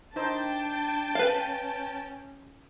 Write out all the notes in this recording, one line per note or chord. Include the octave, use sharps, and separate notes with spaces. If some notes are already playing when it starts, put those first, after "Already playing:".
D4 D#4 C5 G5 A5
C#4 B4 F5